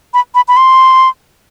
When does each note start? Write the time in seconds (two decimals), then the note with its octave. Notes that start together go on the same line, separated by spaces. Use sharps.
0.14 B5
0.35 B5
0.48 B5
0.57 C6